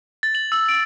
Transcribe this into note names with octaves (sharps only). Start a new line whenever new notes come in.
A6
F#7
E6
D7